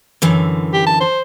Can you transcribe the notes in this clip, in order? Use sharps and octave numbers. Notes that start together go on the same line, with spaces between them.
F#2 D3 E3
G4
A5
C5